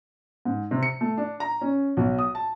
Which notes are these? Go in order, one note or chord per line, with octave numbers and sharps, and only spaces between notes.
G#2
C3
C#7
A3
D4
A#5
C#4
B1
D#6
A5